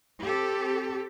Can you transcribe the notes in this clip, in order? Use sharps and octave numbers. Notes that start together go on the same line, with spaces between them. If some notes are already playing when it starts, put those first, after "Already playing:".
C4 G4 A4